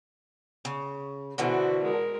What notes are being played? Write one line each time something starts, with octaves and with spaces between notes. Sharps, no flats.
C#3
B2 D3 E3 F#4 C5
G#3 A#4